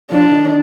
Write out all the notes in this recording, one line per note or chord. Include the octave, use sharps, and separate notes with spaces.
F3 D4
D#3